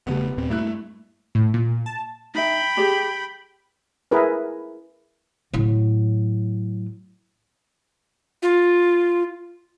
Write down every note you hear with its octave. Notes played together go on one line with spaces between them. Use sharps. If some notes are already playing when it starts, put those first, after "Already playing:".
E1 C#3 G3 A3 B3
D#2 A#2 C4
G2 A3 A#3 E4 F#6
A2
A#2
A5
D#4 E5 G5 B5
G4 G#4 D5
E4 G#4 A#4 B4
A2 F#3
F4